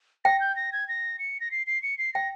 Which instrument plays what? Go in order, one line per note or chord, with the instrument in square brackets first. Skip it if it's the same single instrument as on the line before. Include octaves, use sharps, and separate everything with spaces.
[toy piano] G5 [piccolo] A#6
[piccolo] G6
A#6
G#6
A#6
C#7
A#6
C7
C7
C#7
C7
[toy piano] G5 [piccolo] A#6